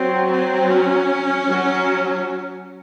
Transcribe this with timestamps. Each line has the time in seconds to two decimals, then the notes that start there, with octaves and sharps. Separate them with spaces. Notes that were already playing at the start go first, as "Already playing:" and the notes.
Already playing: F#3 C4
0.31 C4
0.71 C#4
1.49 F#3